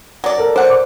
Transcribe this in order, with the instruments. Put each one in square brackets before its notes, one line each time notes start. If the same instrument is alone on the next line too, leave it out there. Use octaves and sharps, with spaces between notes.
[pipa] F#3 D5
[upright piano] A4 A#4
[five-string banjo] C5 [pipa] D5 F#5
[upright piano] D6